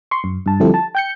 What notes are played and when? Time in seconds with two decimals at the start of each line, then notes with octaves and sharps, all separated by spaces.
0.11 C6 C#6
0.24 F#2
0.46 G2 A5
0.60 D3 F3 G3 C4 E4 A4
0.74 A5
0.95 G5 G6 C#7